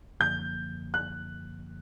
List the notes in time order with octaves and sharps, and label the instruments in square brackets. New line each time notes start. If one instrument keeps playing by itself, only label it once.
[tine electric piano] F#2 D3 F3 A#3 [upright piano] G6
[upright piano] F#6